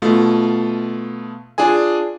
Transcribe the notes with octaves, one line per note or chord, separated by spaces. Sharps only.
B2 A3 F4
D4 F4 G#4 G#5